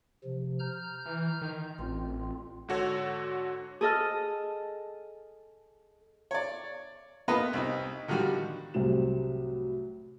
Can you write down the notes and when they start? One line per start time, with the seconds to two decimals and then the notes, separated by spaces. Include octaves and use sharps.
0.24 C3 F3
0.59 A#5 F6 G6
1.06 E3
1.42 D#3
1.79 A1 C4 F4
2.68 G#2 D3 F#4 A4 C#5
3.81 G#4 A4 D#5 F6
6.31 C#5 D5
7.28 A#3 B3 F4 B4 D#5
7.53 C2 D#4
8.08 D3 D#3 F3 G3 F#4
8.74 C2 A2 C3 F#3 E7